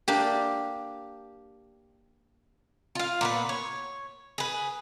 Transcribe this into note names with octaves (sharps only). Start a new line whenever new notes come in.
A#3 D4 G4
F4 F5
A#2 B3 B4
C#5
G#4 B4